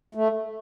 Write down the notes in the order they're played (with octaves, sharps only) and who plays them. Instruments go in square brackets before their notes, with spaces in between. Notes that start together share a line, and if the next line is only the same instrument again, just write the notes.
[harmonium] A3